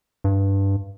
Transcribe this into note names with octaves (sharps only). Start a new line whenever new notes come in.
G2